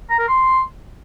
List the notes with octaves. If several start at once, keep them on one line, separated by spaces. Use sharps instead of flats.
A#5
A#4
C6